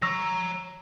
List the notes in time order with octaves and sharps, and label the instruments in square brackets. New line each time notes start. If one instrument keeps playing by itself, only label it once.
[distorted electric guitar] C#5 A#5 [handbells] C#6 E6 A#6